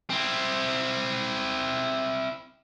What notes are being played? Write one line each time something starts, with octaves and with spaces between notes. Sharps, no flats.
C4 E4